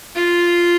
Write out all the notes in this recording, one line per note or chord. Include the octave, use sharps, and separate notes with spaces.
F4